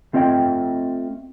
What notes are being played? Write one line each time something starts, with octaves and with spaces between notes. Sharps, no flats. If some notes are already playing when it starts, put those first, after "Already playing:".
A3 C4 F4 D#5 F#5 G5